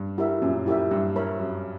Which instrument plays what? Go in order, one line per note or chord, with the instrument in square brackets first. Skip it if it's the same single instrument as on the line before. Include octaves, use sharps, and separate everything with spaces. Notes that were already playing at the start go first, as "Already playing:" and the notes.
Already playing: [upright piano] G2
[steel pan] E4 G4 A#4 E5
[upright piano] F#2 A#2 [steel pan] C#4
[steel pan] E4 G4 A#4 E5
[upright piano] G2 [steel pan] G4
[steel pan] A#4 C#5 E5 B5
[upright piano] F#2 [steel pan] G4